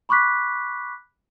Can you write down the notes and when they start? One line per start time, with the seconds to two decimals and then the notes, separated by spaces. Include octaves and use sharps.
0.09 B5 C#6 D6 F#6 B6